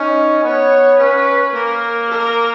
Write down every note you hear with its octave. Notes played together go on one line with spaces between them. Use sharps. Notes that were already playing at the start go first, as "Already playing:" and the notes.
Already playing: C#4 D#4
B3 C#5
C#4 B4
A#3 A#4
A#4